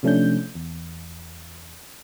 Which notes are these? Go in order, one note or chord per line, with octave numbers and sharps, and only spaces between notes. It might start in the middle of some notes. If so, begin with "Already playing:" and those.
C3 F3 A3 C#4 D4 G6
E2